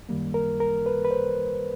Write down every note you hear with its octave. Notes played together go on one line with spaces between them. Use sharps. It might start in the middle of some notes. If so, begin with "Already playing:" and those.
F#2 D#3 G3 A#3
A#4
A#4
B4
B4
C5